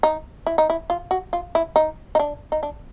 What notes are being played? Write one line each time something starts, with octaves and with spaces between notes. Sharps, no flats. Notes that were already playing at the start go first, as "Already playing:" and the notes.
D#4
E4
D#4
E4
F4
F#4
F4
E4
D#4
D#4
D4
D#4
D4